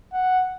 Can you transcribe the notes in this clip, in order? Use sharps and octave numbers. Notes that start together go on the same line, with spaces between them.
F#5